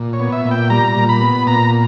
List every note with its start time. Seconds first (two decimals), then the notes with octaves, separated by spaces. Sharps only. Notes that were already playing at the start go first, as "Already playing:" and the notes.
Already playing: A#2
0.13 C#5
0.20 B3
0.32 E5
0.45 A#2
0.51 G5
0.70 G3 A#5
0.97 A#2
1.09 B5
1.21 B3
1.47 A#2 A#5